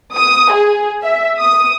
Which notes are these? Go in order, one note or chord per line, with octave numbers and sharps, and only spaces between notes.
D#6
G#4
E5
D#6